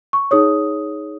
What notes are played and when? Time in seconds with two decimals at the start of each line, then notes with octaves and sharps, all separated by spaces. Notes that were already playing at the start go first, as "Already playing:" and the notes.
0.13 C#6
0.31 D#4 G#4 C#5 D#6